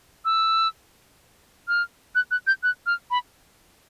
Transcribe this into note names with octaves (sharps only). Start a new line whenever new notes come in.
E6
F6
F#6
F#6
G6
F#6
F6
B5